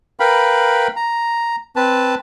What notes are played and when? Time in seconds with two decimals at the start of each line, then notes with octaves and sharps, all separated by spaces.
0.20 A#4 B4 F5 G5 B5
0.96 A#5
1.76 C4 B4 A5